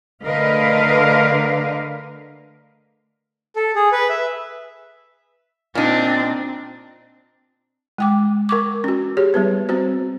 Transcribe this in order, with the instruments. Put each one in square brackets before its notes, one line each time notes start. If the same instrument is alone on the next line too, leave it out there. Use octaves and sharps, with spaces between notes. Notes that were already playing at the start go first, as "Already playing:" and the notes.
[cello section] D3 A3 A#4 B4 D#5 F5
[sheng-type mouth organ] A4
G#4
B4
E5
[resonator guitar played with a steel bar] A#2 D#4 [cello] C4 D4
[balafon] G#3 G5 D6
A#4 C#6 D6
C#4 F#4
G4 G#4 C#5
G3 B3 B4
C4 F#4 C5